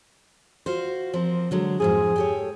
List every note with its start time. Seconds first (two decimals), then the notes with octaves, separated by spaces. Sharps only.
0.66 F4 F#4 C5
1.13 F3 C4 A#4
1.51 D3 F#3 G#3
1.80 F2 G#2 F3 G#4
2.16 G4 A4 C#5